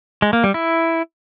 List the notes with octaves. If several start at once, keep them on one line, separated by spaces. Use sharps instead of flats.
G#3
A#3
G3
E4